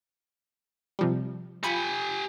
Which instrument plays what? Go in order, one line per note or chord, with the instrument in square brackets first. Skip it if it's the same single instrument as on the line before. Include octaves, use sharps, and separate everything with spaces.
[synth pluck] C3 F3 G3
[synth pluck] F4 B5 C#7 [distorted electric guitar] G4 G#5